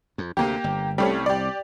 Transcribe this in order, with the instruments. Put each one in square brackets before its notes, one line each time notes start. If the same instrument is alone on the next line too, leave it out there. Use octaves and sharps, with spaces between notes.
[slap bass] F2
[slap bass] D2 C3 [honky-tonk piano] A#3 G4
[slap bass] G1
[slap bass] C2 C3 [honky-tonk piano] G3 A3 C#4
[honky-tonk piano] G4 D5